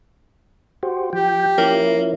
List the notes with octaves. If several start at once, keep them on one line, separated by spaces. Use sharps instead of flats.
F#4 G4 C5
F3 G4 G5
F3 A#3 C#4 E4